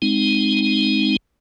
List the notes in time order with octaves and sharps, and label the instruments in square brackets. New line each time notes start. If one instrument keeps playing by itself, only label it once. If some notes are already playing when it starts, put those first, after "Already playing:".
[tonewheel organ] G#3 C4 D#4